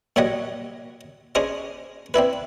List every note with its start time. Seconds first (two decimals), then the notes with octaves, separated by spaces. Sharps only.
0.16 A#2 F#3 G3 C#5 D#5 F#5
1.35 C#4 D4 G#4 C5 D#5
2.14 C4 D4 E4 B4